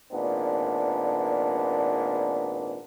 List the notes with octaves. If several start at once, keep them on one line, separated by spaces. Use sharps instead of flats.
G#1 A#2 B3 D4